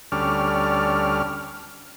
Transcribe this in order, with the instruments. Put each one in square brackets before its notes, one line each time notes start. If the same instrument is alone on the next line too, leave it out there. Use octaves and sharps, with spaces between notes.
[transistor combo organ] D2 G3 C#4 A4 D5 F6